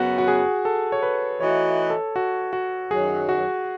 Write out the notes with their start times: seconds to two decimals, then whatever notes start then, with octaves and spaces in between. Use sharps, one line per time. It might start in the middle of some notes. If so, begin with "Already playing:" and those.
Already playing: F#2 C#3 F#3 B3 F#4
0.18 F#4
0.28 G#4
0.65 A4
0.92 C#5
1.03 B4
1.40 E3 A3 D#4 F#4 C#5
1.90 A4
2.16 F#4
2.53 F#4
2.91 F#2 D#3 F#3 G#4
3.29 F#4